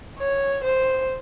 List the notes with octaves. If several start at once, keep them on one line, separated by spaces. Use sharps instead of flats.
C#5
C5